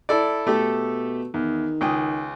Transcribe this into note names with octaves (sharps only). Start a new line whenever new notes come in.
E4 A4 D5
B2 A3 G4 A4
E2 D#3
C#2 G5 D#6